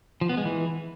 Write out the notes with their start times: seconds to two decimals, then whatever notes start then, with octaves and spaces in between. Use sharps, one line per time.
0.21 F3
0.29 B3
0.37 G#3
0.45 E3